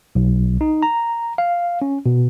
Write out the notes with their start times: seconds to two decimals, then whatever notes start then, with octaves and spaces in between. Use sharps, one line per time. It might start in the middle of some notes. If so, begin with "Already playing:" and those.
0.15 B1
0.61 D#4
0.83 A#5
1.38 F5
1.82 C#4
2.06 B2